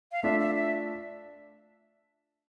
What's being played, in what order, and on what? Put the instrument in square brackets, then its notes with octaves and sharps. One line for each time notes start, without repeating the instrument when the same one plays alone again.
[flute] F5
[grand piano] A3 D4 F4 [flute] E5
[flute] E5
E5